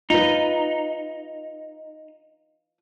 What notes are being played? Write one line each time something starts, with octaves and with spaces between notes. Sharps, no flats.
D#4 F4 B4